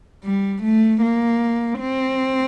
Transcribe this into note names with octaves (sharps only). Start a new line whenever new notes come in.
G3
A3
A#3
C4